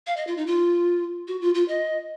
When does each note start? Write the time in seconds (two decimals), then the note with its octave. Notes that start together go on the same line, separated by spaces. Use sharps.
0.07 F5
0.17 D#5
0.27 F4
0.37 D#4
0.47 F4
1.28 F#4
1.41 F4
1.55 F4
1.68 D#5